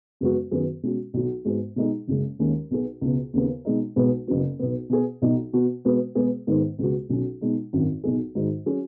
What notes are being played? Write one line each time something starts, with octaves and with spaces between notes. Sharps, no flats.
F#2 C#3 G#3 B3 F#4
F#2 D#3 F#3 B3 G#4
B2 G#3 C#4 F#4
B1 B2 F#3
G#2 G#3 B3 F#4
B2 G#3 D#4 G#4
F#1 F#2 C#3 G#3
D#2 D#3 G#3 C#4
B1 B2 B3 G#4
C#2 B2 B3
D#2 C#3 B3
B2 G#3 D#4
B1 B2 G#3 B3
F#1 F#2 C#3 B3 F#4
B1 B2 B3
B2 B3 G#4
B1 B2 F#3 D#4
B2 B3 F#4
B2 G#3 B3 F#4
B2 G#3 B3 G#4
G#2 D#3 G#3 B3 D#4
C#2 B2 G#3 B3 F#4
B1 B2 F#3 C#4
B2 G#3 D#4
G#1 F#2 D#3
B1 B2 F#3 D#4 G#4
G#2 D#3 G#3 D#4 F#4
F#3 C#4 G#4